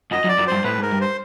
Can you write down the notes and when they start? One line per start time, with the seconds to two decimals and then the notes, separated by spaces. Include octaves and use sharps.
0.11 F#2 D#5
0.24 F#2
0.29 D5
0.39 F#2
0.48 G2 C5
0.64 A2 B4
0.79 G#2 A#4
0.91 G2
1.01 C5